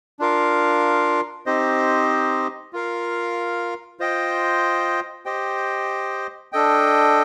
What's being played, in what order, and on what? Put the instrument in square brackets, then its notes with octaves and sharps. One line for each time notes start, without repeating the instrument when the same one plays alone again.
[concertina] D4 F4 A#4 F5
C4 D#4 G4 C5 D#5
F4 A#4 F5
F4 C5 D#5 G5
G4 C5 D#5 G5
D4 A4 D#5 G5